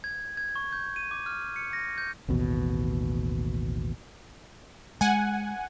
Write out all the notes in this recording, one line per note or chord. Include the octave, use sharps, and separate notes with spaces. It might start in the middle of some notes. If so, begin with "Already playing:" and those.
G#6
G#6
C#6
G6
D#7
D6
F6
C#7
A#6
G6
A1 D#2 B2
G#3 F#5 G#5